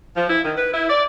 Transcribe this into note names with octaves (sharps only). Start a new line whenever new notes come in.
F3
E4
D#3
B4
E4
D5